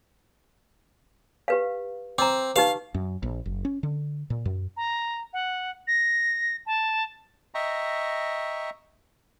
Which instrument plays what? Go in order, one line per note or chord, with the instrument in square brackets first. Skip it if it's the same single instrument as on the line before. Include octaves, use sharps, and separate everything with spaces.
[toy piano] G4 B4 F5
[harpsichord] C4 [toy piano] A#5 D6
[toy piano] D#4 G4 B4 [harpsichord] F5
[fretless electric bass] F#2
A#1
F#1
C#4
D3
A#2
F#2
[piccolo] A#5
F#5
A#6
A5
[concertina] D#5 E5 G5 A#5 C#6